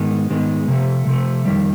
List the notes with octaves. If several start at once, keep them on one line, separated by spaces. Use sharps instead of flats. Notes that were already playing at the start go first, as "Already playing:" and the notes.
Already playing: G#2 D#3 G#3 B3
G#2 D#3 G#3 B3
C3 F3 A3
C3 F3 A3
F2 C3 D#3 G3